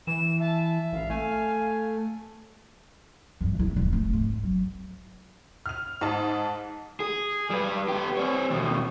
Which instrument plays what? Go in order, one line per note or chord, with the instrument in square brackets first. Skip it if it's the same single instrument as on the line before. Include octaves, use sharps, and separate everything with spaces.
[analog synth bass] E3 [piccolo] E7
[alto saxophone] E5 [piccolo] A5
[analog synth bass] A1 [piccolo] F5
[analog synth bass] A3 [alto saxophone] G#5
[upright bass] G2 D#3
D3 E4
D#1 E2
A3
G#2
F#3
[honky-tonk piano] F6 F7
G#2 D#5 A5
[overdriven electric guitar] G#4
G3 B4
B3 G4
C4 C#5
D#2 B2